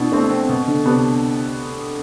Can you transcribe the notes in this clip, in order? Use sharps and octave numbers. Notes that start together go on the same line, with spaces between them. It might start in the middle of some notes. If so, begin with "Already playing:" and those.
Already playing: B2 D4 E4
A3 C4 D4
C4
B2
D3
C3 B3 D4